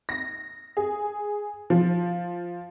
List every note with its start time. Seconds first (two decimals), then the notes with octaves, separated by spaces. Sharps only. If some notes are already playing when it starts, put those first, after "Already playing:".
0.09 A#6
0.77 G#4
1.70 F3